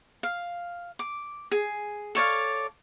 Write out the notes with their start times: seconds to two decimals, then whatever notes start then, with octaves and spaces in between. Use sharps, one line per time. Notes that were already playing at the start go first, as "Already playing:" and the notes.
0.23 F5
0.99 D6
1.52 G#4
2.15 A4 C#5 D5 F5